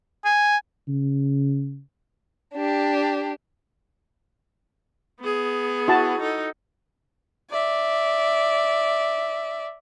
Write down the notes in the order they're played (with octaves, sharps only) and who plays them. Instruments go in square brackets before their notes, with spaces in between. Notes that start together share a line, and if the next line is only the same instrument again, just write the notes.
[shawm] G#5
[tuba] C#3
[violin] D4 G4
[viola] B3 G#4
[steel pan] E4 F#4 A5
[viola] D#4 A4
[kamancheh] D5 E5